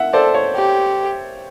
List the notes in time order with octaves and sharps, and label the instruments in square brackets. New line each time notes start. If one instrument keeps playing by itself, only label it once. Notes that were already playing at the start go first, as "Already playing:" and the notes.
Already playing: [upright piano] E5 F#5
[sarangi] A4 [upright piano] C5 D5
[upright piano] C#5
[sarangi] G4